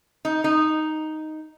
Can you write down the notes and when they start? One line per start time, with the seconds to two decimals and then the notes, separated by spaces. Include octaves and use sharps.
0.25 D#4
0.44 D#4